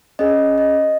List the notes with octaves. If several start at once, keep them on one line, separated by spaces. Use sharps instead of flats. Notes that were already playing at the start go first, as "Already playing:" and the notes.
C#4 G#4 D#5
D#5